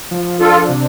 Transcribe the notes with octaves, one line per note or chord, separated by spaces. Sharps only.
F3
D4 F4 A4
C3